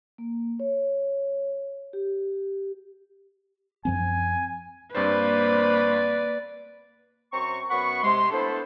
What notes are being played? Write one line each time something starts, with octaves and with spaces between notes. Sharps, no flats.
A#3
C#5
G4
F#2 F3 C4 G#5
G2 A#3 C4 B4 C5 D5
F#2 C4 A#5 C#6
F#2 B3 F#5 B5 C#6
C3 G#3 C6
A3 B3 D4 E4 A4 C5